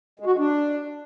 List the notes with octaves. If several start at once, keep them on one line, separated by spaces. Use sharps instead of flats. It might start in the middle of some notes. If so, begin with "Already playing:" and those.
G#3
F#4
G#3
D4